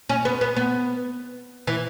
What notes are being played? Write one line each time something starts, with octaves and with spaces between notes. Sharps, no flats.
C#4
B3
B3
B3
E3